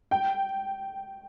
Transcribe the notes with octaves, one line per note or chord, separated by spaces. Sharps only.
G5